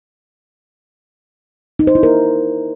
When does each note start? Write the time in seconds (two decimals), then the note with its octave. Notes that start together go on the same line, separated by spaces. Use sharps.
1.79 D#4
1.87 C5
1.95 E4
2.03 A#4